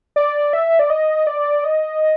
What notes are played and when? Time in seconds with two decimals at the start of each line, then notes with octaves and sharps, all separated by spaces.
0.16 D5
0.53 E5
0.79 D5
0.90 D#5
1.27 D5
1.64 D#5